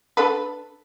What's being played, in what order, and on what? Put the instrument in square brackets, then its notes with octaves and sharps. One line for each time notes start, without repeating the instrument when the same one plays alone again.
[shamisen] D4 A4 B4